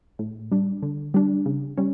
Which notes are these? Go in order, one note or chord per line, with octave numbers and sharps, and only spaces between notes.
A2
G3 D4
D3
G3 D4
C#3
G3 C#4